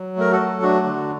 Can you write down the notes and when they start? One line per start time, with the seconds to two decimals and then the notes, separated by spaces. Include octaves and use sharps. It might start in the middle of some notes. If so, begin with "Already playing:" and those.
Already playing: F#3
0.17 A3 A#4
0.31 F#4 A4
0.40 F#3
0.62 A3 D4 F#4
0.86 D3